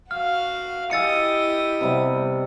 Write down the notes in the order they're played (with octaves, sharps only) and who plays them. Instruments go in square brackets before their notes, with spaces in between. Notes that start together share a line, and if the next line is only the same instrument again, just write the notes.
[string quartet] F#4 F5 [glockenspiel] F6
[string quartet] E4 G4 D#6 [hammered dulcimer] D#5 G#5 [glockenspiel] E6 A6 C#7
[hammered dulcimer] C3 G3 B3